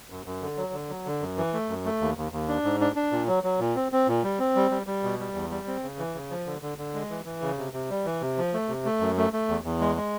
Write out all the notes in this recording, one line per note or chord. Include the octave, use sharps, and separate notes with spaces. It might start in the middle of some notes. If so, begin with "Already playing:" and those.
F#2
F#2
D3
F#3
D3
F#3
D3
F#2
E3
A3
F#2
A3
D#2
D#2
D#2
D4
G#2
D4
D4
A#2
F#3
F#3
A#2
C4
C4
A#2
G3
C4
G3
G3
G3
B2
G3
E2
G3
C4
C#3
E3
C#3
F3
D3
D3
D3
G#3
E3
E3
C#3
C3
C3
G3
E3
C3
F3
A3
C3
A3
F#2
A3
A3
E2
E2
G#3
G#3